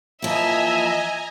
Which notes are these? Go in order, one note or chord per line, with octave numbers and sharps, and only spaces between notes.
E3 F3 A#3 D#5 E5 G#5 A#5